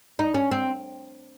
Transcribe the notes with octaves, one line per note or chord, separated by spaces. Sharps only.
D#4
C#4
C4